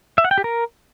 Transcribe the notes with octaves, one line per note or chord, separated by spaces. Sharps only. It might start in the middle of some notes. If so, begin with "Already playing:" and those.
E5
F#5
G5
G4
A#4